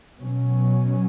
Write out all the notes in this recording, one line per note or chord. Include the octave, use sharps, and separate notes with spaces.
B2 F#3 C#4